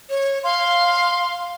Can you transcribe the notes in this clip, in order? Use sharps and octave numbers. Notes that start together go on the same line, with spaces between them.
C#5
F5 C6